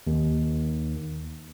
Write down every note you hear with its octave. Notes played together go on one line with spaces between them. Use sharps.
D#2